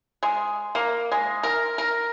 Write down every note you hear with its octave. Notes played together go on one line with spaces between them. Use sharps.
G#3
A#3
G#3
A#4
A#4